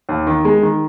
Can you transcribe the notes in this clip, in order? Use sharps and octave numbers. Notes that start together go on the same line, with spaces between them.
D#2
D#3
G#3
D#3